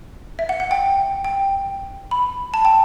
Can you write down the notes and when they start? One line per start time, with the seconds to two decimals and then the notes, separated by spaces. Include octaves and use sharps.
0.39 E5
0.49 F#5
0.60 F#5
0.71 G5
1.25 G5
2.11 B5
2.54 A5
2.65 G5